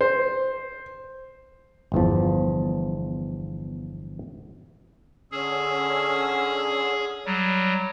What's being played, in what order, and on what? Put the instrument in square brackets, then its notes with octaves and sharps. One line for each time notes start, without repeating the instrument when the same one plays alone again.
[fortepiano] C5
[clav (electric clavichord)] G1 E2 F3
[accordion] D3 C#4 E6 [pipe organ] G#4
[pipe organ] F#3 G3